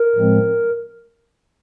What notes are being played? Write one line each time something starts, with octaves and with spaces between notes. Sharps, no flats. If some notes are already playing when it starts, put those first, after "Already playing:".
Already playing: A#4
A2 F3 G#3 C4